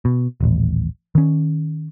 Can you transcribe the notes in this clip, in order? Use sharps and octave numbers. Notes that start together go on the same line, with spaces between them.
B2
D#1 A1
D#3 C#4